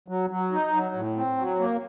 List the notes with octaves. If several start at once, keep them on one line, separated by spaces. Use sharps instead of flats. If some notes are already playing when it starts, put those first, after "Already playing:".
F#3
F#3
D#4
F#3
A2
C4
F#3
A#3